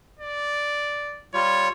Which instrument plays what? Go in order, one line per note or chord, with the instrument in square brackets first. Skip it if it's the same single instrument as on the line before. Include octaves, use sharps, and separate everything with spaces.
[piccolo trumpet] D5
[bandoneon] G3 F4 [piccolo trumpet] C#5